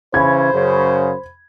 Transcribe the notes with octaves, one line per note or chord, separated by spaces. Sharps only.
C#3 E3 C#4 C5 B5 G#6
F#2 C#3